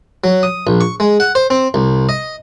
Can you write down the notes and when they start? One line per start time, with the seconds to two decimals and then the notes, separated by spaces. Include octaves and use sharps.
0.24 F#3
0.43 D#6
0.67 A#1
0.81 C#6
1.00 G#3
1.20 F#5
1.35 C5
1.50 C4
1.74 C2
2.09 D#5